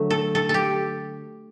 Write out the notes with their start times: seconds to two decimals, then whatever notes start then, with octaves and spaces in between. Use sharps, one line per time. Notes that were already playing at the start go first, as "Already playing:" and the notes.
Already playing: D3 F#3 A3
0.10 A4
0.35 A4
0.49 A4
0.54 G4